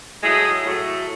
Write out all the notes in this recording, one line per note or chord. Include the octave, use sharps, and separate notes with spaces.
A2 F#3 G#3 A3 G#4
A2 F#3 A3